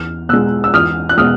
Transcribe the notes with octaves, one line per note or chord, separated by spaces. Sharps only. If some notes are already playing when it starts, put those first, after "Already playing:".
Already playing: E2 F6
B2 G#3 E6 F#6
E6
E2 D#6 F6
F#6
B2 G#3 D#6 F6